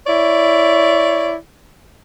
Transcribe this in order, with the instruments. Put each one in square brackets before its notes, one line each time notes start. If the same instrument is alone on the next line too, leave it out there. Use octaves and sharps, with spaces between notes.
[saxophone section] E4 C#5 D5